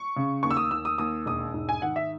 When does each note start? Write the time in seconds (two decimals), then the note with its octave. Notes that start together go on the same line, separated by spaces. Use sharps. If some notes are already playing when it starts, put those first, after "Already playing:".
Already playing: C#6
0.16 C#3
0.43 D#2 C#6
0.51 E6
0.57 D#6
0.71 D#2 E6
0.85 D#6
0.98 D#2 D#6
1.26 E1 D#6
1.54 G#2
1.69 G#5
1.82 D#3 F#5
1.96 E5